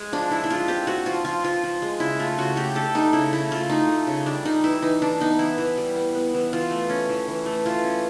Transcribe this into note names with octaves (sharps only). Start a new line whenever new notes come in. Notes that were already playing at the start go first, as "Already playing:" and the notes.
Already playing: G#3
F3 D4
F3 E4
E4
G#3 F4
C4 G4
C4 F#4
F3 F4
F3 F4
F3 F4
F3
G#3
C#3 E4
A3 F4
C#3 F#4
A3 G4
D4 A4
D4 D#4
C#3 E4
A3 E4
A3 F4
A3 D#4
A3
C#3
G3 D4
G3 D#4
E3 E4
E3 D#4
E3 D4
B3 D#4
E3 E4
E3
G3
B3
B3
E3
E3 F4
A3
C#4
E3
E3
A3
E3 F4
C#4